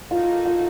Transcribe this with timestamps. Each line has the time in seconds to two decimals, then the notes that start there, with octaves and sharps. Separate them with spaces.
0.10 A#3 D#4 F4 F#4 A4
0.46 F4